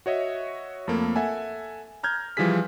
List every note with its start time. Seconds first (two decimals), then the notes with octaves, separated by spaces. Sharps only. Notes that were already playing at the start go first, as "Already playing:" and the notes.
0.06 F#4 C#5 D#5 E5
0.88 F2 A3 A#3
1.16 A4 E5 F#5 G#5
2.03 A#5 F6 G6 G#6
2.37 E3 F3 G3 E4 G#4 B6